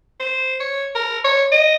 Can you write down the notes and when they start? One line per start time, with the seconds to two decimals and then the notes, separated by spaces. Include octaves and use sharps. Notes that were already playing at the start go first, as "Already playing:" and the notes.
0.19 C5
0.60 C#5
0.95 A#4
1.24 C#5
1.51 D#5